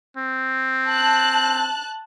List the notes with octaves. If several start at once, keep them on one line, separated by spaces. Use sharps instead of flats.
C4
A5 F#6